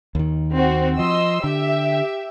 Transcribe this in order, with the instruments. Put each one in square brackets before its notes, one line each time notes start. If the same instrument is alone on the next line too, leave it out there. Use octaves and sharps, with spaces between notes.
[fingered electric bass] D#2 D#3
[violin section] C4 F#4
[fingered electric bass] F3 [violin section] D#5 C6 E6
[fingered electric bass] D3 [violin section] G4 E5